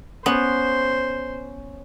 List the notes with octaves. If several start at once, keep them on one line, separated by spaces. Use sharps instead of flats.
B3 C#4 C5